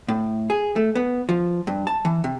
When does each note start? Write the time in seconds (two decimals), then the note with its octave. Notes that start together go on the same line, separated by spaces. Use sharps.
0.08 A2
0.50 G#4
0.76 A3
0.95 B3
1.29 F3
1.67 G2
1.87 A5
2.05 E3
2.24 C3